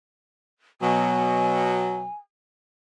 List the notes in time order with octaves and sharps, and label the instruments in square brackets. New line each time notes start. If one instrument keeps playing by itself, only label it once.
[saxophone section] B2 F#3 [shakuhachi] G#5